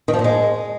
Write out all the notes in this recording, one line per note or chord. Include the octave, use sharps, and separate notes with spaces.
D#3
F3
A#2
G#3